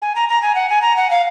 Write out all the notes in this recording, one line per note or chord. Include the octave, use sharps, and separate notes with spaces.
G#5
A#5
A#5
G#5
F#5
G#5
A#5
F#5
F5